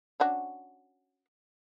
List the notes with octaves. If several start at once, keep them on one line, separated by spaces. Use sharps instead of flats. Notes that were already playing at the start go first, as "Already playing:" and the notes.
C#4 D4 F#4